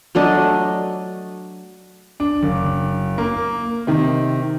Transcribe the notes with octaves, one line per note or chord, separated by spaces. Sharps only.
F#3 A3 D4 D#5
D4
F#1
A#3
C3 D#3